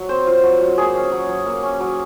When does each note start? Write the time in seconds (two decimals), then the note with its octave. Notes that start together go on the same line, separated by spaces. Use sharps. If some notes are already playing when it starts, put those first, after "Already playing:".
Already playing: F#3
0.09 C4 C5
0.27 F4
0.44 F#3
0.61 F#3
0.78 A#3 G#4
0.95 C#4
1.12 F#3
1.29 F#3
1.46 A#3
1.63 C#4
1.80 F#3